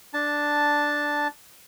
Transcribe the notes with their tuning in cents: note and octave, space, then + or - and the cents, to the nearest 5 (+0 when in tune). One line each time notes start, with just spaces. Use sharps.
D4 +0 A5 +0